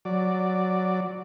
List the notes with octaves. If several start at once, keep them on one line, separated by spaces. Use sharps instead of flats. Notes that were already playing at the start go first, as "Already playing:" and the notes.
F#3 D5